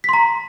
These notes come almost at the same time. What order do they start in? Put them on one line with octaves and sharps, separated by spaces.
B6 C6 A#5